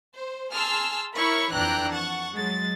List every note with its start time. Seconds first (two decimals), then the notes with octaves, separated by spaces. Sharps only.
0.14 C5
0.53 G#4 A5 C6 E6 F6
1.15 E4 A#4 C#5 B5 C#6
1.53 F2 E3 D4 G5 A#5 F#6
1.91 F#5 A5 C#6
2.33 F#3 G#3 A6